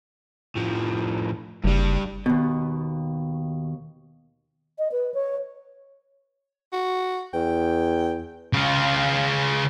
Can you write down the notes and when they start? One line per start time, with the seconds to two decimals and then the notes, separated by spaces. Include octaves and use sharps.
0.56 A2 F3
1.64 F#1 G2 G3
2.26 D#2 B2
4.79 D#5
4.92 B4
5.14 C#5
6.73 F#4
7.34 E2 G5
8.53 C#3 F4